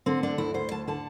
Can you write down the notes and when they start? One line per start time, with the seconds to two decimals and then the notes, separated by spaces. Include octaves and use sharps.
0.06 D3 C4
0.23 D2 D4
0.38 D2 E4
0.54 D2 C5
0.71 D2 A5
0.87 D3 A5